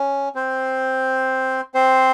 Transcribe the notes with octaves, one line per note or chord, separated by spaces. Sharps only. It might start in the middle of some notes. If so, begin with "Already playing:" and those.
Already playing: C#4
C4 C5
C4 C5